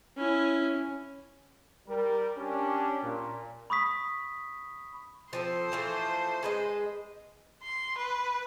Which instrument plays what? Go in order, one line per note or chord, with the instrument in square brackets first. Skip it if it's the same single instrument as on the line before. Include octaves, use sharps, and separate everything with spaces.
[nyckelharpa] C#4 E4
[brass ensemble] G3 A#4
C#4 D4 G4
A#2
[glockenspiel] B5 C#6 D#6 B6
[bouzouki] F3 C4 A4 [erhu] C5
[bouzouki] E3 F3 A3
G#3 B4 D#5
[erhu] C6
B4